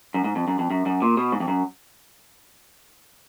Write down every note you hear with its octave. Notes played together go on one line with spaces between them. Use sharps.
F#2
G#2
F2
F#2
F2
F#2
F#2
A#2
B2
G#2
F2
F#2